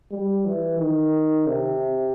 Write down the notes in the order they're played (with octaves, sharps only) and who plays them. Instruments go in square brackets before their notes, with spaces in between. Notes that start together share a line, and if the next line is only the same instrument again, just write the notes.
[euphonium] G3
E3
D#3
C3